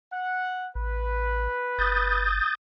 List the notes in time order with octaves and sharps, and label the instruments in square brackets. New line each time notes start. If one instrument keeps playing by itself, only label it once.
[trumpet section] F#5
[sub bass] A1 [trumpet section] B4
[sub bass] G1 [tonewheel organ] D#6 G6 A6